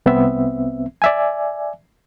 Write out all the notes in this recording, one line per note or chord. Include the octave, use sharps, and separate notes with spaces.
C2 B3 C4 E5
D5 E5 G#5